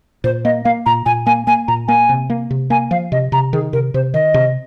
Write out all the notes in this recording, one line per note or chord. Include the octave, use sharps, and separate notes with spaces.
A#2 C5
A#3 D#5
A#3 F5
A#2 A#5
A#2 G#5
A#3 G#5
A#3 G#5
A#2 A#5
A#3 G#5
C3
A#3
C3
A#3 G#5
F3 F5
C3 D#5
C3 A#5
D#3 G#4
C3 A#4
C3 C5
D#3 D#5
C3